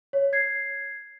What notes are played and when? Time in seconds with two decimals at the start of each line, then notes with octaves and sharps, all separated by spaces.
0.13 C#5
0.33 G#6 C7